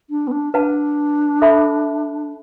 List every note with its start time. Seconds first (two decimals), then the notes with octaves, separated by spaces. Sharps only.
0.10 D4
0.27 B3
0.32 D4
0.53 D4 B4 F#5 A5
1.42 A4 E5 B5